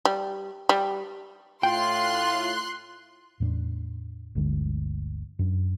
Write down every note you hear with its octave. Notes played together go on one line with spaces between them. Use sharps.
G3
G3
A2 F4 G5 C6 F#6
E2 A2 A3 D4
G1 D2 D3 G#3
F#2 D4